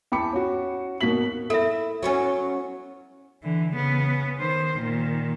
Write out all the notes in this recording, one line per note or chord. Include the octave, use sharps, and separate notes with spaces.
E2 G5 A5 B5 D6 C#7
C#4 F#4
D#2 B2 A#3 F#4 B6 F#7
E4 A4 E5
F#3 B3 C#4
D3 E3
C#3 B3
D#3 C5
A#2 D#3